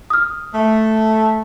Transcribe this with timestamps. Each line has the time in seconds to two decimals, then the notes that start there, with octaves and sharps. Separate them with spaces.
0.10 D#6 F6
0.54 A3